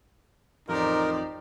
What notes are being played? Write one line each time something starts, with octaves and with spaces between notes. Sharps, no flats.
A1 F2 D#4 F4 G4 A#4 C5 D5